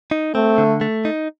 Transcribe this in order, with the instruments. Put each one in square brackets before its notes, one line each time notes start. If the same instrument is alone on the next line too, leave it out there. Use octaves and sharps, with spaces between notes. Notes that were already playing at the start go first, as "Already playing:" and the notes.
[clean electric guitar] D#4
[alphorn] A3 [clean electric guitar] C4
[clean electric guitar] D3
A3
D#4